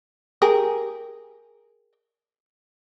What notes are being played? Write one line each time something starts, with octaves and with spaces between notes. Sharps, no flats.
G4 G#4 A#4